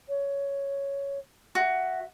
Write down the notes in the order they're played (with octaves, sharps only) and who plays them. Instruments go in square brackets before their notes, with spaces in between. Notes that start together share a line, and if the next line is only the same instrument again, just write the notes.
[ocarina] C#5
[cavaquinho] F#4 [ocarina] E5